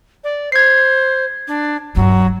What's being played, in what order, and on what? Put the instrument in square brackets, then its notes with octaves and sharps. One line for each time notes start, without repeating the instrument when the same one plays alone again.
[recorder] D5
[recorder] C5 [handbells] G#6 C7
[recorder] D4
[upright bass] D#1 G2 [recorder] F#3